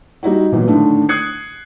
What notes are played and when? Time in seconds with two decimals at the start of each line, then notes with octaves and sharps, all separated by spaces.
0.23 G3 D#4 E4 F#4
0.52 A#2 E3 F#3 B3
0.67 A2 D3 D#3 A3 D4
1.09 D#6 F#6 G#6 C7 C#7